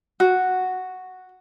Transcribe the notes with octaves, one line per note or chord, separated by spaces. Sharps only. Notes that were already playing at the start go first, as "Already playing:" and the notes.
F#4